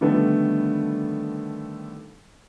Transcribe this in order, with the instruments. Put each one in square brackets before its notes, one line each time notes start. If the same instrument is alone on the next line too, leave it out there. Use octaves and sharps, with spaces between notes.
[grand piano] D3 D#3 F3 G3 A3 B3